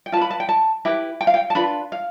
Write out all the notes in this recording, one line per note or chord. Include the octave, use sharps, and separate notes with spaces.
G5
F4 B4 A5 B5
A5
G5
A5
E4 G4 B4
G5
F5
G5
A5
D4 F4 B4 B5
F5